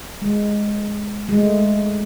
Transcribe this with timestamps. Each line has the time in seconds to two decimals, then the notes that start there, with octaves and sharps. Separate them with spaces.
0.22 G#3
1.29 G#3
1.39 A3